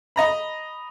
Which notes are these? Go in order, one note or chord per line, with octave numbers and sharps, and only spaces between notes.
D#5 A#5 B5